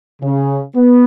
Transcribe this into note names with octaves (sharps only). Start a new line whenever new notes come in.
C#3
B3